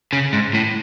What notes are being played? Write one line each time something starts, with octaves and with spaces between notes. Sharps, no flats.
C#3
G#2
A2